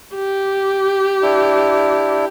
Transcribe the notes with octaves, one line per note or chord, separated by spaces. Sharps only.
G4
D4 E4